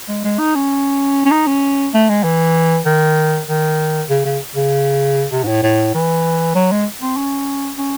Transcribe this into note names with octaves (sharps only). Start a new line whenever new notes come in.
G#3
G#3
D#4
C#4
C#4
D#4
C#4
A3
G#3
E3
D#3
D#3
C#3
C#3
C#3
C3
G#2
A2
A2
E3
F#3
G#3
C4
C#4
C#4